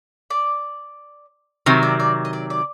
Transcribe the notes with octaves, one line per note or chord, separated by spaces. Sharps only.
D5
C3 D#3 F#3
D5
D5
D#5
D5
D5